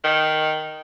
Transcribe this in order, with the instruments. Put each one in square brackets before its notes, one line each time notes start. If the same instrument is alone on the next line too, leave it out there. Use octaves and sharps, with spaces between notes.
[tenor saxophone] D#3